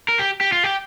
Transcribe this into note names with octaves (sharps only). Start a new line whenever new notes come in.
A#4
G4
G4
F4
G4